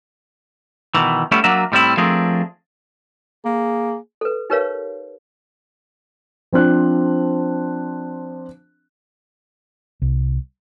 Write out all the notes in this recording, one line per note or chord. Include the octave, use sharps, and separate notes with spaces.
B2 D#3 E3
G3 A3 B3 C#4 E4
F#3 A#3 D4 F#4 E5
A2 G3 C4 E4
F3 A3 C4 D4 G#4 A#4
A#3 G#4
A4 B4
D#4 G4 A#4 B4 C#5 F5
F3 C4 D4 F#6
C2